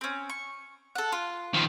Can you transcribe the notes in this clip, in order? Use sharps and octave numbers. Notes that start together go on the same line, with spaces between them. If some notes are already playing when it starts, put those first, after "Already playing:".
C4 C#4
C#6
A4 F#5
F4
D#3 F3